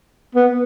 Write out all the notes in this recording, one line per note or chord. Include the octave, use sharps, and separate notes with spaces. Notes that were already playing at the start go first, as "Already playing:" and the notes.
B3